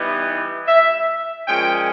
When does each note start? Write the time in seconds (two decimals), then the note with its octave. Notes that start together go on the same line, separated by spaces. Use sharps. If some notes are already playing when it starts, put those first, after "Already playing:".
Already playing: E3 G3 B3 D#4
0.67 E5
1.47 A#2 F3 G#3 C#4 G5